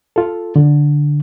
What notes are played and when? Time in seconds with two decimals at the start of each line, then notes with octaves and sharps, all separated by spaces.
0.16 F4 A4
0.56 D3